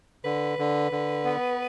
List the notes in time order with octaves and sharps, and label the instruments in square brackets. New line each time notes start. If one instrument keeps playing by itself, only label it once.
[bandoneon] D3 [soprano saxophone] B4
[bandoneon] D3
D3
B3